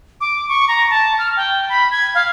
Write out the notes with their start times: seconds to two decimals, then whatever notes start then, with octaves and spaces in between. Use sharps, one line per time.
0.21 D6
0.49 C#6
0.68 A#5
0.90 A5
1.19 F6
1.36 G5
1.69 B5
1.91 G#6
2.15 F5